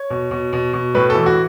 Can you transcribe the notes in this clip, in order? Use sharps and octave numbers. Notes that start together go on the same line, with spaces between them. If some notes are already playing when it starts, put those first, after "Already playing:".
Already playing: C#5
B2
B2
B2
B2
A2 B4
A4
E3
F#4